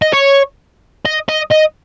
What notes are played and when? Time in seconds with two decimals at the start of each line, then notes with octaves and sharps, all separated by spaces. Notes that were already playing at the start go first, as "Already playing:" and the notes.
0.02 D#5
0.13 C#5
1.06 D#5
1.29 D#5
1.52 D#5